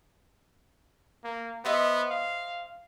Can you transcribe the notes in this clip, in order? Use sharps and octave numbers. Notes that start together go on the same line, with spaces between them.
A#3
B3 C5 D#5 E5
F5